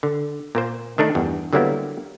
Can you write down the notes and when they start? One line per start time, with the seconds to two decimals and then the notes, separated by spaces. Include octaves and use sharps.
0.03 D3
0.55 A#2 A#3 C5
0.98 D#3 A3 D4 D#4
1.15 E2 G2
1.53 D3 F#3 G3 A#3 B3 E4